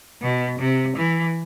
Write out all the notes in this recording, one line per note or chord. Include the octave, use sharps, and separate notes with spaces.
B2
C3
E3